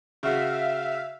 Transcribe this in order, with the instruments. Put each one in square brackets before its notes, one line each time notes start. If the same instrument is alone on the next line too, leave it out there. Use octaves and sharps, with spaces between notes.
[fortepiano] C#3 F#4 [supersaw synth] E5 F5